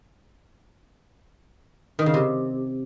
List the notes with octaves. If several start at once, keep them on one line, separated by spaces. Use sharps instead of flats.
D#3
C#3
C3